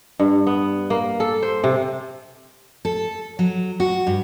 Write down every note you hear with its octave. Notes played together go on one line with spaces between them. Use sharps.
G2
B3
A#3
A4
C5
C3
A4
F#3
F#4
G2